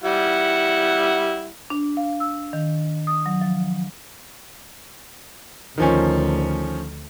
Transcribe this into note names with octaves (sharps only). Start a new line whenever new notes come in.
G3 E4 F#5
D4
F5
E6
D#3
D#6
F#3
F3
D2 D#3 F3 C#4